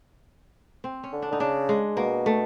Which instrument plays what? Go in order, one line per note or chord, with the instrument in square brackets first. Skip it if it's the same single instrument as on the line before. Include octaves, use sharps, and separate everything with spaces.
[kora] C4
C#4
[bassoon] D3
[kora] D4
[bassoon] D3 [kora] D#4
[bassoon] C#3 [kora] D4
[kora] G#3
[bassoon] B2 [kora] A#3
[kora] A3